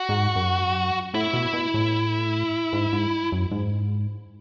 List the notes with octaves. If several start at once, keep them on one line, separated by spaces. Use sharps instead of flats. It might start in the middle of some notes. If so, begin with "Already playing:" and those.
Already playing: F#4
G#2
F#2
A2 E4
B2
B2
A2
G#2
G#2
F#2
G#2